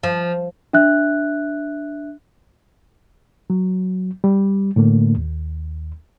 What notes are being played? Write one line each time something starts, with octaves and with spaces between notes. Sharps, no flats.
F3
D4 E5 F#6
F#3
G3
A2 D3 A3 A#3
D#2